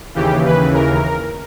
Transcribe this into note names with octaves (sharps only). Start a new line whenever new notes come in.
D#2 C#3 E3 G4
B4
A#4